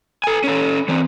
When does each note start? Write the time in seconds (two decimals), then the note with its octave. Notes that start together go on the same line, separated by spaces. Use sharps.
0.24 A4 G#5
0.44 C#4 A4
0.88 E3 C4